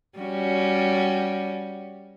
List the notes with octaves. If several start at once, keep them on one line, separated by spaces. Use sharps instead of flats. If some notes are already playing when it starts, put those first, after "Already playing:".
G3 C#4 F#4